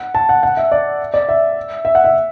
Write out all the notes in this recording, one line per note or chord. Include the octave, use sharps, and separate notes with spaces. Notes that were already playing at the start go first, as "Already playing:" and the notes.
Already playing: F#5
A5
F#5
F#5
E5
D5
D5
E5
E5
F#5
E5